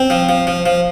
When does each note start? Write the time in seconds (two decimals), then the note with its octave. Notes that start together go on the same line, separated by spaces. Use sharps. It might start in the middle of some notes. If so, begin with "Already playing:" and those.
Already playing: C4
0.10 F3
0.29 F3
0.47 F3
0.66 F3